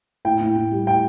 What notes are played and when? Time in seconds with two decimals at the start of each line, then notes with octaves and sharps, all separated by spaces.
0.25 A2 G5
0.41 A2
0.57 A2
0.72 G3
0.87 A2 G5